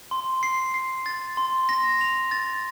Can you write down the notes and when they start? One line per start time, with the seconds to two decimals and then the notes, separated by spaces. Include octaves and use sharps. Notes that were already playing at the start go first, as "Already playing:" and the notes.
0.11 C6
0.43 C7
0.74 C7
1.06 A6
1.37 C6
1.69 A#6
2.01 F7
2.31 A6